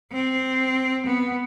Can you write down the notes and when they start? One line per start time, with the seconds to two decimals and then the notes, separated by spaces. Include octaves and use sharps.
0.12 C4
1.06 B3